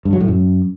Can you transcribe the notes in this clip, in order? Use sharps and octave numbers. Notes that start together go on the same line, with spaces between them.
G2
F#3
A2
F#2